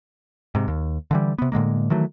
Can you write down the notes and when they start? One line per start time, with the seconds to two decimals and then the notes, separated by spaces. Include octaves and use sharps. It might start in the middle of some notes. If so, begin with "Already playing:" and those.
0.55 G#2 C3
0.68 D#2
1.11 D3 E3 G3
1.38 C3 B3
1.52 A2 D3 G#3 A#3
1.90 D#3 E3 F#3 A3